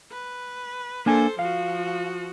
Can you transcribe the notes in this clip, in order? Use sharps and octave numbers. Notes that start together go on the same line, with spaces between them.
B4
A#3 D4 A4 C5 G#5
F3 F#4 F5